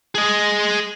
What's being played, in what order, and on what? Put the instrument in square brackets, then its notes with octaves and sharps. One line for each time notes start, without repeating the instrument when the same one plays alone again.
[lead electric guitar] G#4 D#5